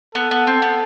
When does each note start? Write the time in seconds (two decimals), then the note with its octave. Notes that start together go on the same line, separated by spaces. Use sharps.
0.15 B3 A4
0.31 B3
0.47 C4
0.62 B3